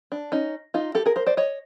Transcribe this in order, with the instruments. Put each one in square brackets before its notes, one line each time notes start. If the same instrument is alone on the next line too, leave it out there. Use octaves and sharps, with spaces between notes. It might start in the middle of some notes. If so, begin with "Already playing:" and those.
[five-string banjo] D4
C#4 D#4
D#4 F4
G4 A4
G#4 A#4
A#4 C5
C5 D5
C#5 D#5